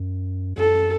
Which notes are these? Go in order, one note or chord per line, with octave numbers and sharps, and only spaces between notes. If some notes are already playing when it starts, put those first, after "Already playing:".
Already playing: F#2
F#2 A4